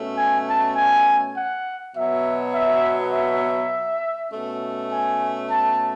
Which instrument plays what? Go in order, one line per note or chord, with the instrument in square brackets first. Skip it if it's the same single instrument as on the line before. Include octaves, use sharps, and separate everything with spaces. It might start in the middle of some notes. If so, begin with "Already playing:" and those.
Already playing: [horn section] B2 A3 C#4
G#5
A5
G#5
F#5
B2 F#3 B3 E5
E5
E5
B2 A3 C#4
G#5
A5